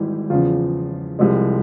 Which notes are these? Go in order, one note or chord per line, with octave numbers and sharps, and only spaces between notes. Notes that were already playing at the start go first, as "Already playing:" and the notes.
Already playing: G#1 G#2 E3 G3 E4
E2 C#3 F3 F4 F5
C2 C3 F3 G#3